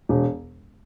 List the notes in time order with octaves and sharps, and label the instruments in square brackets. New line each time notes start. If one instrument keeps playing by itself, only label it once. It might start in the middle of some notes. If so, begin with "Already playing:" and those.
[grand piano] E1